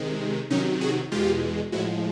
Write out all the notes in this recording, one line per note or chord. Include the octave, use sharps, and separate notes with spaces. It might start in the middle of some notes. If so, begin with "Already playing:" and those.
Already playing: C3 D#3 G#3
C3 D#3 F#3 C#4 D#4
F#4 G#4
E2 B2 G#3 F4 G4
A2 F3 G#3 E4 F#4